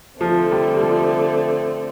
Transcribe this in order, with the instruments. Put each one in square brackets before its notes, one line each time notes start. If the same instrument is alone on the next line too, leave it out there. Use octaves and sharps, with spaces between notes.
[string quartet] D3 A3 C4 [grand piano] F3
[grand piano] G3
G3
F3